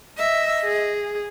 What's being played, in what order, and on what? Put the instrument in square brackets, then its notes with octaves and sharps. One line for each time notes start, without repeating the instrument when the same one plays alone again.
[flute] D#5 [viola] E5
[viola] G#4